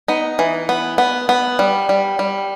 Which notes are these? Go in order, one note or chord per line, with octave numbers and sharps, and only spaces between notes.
B3 D#4
E3
B3
B3
B3
G3
G3
G3